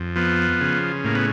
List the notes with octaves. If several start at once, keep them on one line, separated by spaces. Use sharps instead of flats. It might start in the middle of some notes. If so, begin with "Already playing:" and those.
Already playing: F2
F3 B3
C#3
A2 A#3
B3